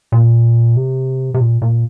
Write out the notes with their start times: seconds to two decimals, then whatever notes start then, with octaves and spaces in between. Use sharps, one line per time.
0.12 A#2
0.76 C3
1.34 C3
1.40 A#2
1.62 A#2